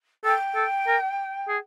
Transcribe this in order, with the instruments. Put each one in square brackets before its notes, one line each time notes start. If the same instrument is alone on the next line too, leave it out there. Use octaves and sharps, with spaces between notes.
[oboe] A4 [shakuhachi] G5
[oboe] A4
A#4
G#4